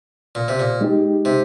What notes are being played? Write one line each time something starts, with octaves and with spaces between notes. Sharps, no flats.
A#2
C3
A#2
G#3 D#4 G4
C3